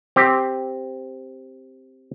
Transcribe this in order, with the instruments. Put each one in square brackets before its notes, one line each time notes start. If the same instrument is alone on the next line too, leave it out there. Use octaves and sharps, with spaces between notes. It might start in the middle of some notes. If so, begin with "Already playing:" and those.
[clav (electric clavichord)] C4 G4